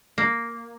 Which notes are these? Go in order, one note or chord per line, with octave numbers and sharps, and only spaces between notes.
A#3